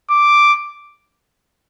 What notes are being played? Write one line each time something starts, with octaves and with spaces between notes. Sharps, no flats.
D6